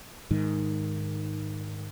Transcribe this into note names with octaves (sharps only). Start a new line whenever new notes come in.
G#2 D#3